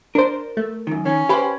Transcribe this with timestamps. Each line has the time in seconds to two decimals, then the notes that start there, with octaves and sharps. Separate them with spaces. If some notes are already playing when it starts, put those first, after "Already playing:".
0.15 D4 A#4 C5
0.57 A3
0.87 F#2 D#3
1.05 D#3 C#4
1.29 G4 B4 C5 F5 B5